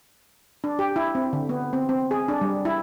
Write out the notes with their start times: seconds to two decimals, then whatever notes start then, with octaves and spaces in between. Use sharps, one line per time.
0.64 D4
0.79 G4
0.96 E4
1.15 C4
1.33 D3
1.49 B3
1.73 C4
1.89 C4
2.11 G#4
2.28 D4
2.41 G3
2.65 E4